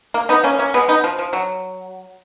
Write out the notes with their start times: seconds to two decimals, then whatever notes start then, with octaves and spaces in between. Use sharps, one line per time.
0.14 A#3
0.29 B3 D#4
0.44 A#3 C#4
0.59 A#3 C#4
0.74 G#3 B3
0.88 B3 D#4
1.04 F3
1.19 F3
1.33 F#3